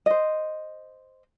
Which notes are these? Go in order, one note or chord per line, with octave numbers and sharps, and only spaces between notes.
C5 D#5